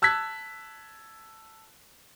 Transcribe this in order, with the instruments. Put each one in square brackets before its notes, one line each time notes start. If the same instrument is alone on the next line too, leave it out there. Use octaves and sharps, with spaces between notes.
[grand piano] A5 E6 F#6 G#6 B6